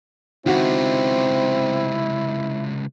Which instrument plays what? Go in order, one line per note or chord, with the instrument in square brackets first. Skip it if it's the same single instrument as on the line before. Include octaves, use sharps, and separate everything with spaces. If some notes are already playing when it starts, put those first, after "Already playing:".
[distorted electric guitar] C#2 C3 [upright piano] D#3 F#4 [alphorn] C4 [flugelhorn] E4